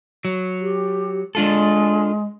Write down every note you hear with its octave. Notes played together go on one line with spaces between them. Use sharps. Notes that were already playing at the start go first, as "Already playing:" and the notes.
F#3
G4
G#3 D4 F4 A4